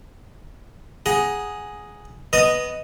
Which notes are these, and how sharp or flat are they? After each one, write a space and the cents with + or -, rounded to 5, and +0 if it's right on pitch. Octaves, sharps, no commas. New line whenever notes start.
G#4 +0 F#5 +0 A#5 +15
B3 +0 D#5 +0 A#5 -45